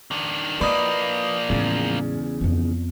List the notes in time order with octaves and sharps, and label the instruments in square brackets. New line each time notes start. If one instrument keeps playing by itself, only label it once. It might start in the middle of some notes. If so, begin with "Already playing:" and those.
[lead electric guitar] D#3 D4
[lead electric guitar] F3 A#3 [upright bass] E4 [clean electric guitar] B4 D#5 [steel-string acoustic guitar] D5
[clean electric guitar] E2 C#3 [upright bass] A2 G#3
[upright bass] F2 B3